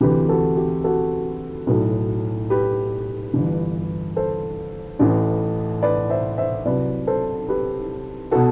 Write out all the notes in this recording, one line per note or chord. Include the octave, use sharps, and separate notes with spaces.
D2 C3 E3 G4 B4
F#4 A4
G4
F#4 A4
B1 A2 F#3
G4 B4
G1 G2 E3
A4 C5
A1 A2 E3
B4 D5
C5 E5
C5 E5
C2 C3 F#3 B4 D5
A4 C5
G4 B4
B2 F#4 A4